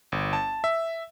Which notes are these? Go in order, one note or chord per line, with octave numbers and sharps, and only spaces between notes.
G1
A5
E5